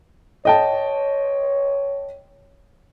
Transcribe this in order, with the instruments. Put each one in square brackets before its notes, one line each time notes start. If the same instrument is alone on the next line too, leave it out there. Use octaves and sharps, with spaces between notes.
[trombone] C#5 [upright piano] D#5 G5 A5